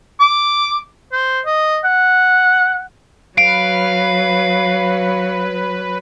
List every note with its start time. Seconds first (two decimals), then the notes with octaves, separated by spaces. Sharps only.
0.20 D6
1.12 C5
1.46 D#5
1.85 F#5
3.38 F#3 B4 F5 D7